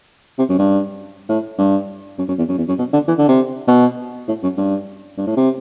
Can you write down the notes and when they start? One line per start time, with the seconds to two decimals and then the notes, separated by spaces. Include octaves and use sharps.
0.39 C3
0.49 F#2
0.59 G2
1.29 A2
1.58 G2
2.18 F#2
2.28 F#2
2.38 E2
2.48 F#2
2.58 E2
2.68 F#2
2.78 B2
2.93 D3
3.08 E3
3.18 D3
3.28 C3
3.68 B2
4.28 A2
4.43 F#2
4.57 G2
5.17 G2
5.27 A2
5.37 C3